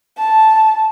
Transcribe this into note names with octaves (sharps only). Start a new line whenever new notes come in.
A5